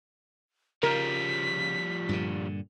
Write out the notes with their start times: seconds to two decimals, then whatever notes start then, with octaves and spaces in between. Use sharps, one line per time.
0.83 C#3 F3 G3 A#4 B6
2.09 G2 A#2 D3